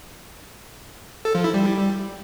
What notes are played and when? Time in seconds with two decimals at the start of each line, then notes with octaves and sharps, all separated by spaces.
1.25 A4
1.35 F3
1.44 E4
1.54 G3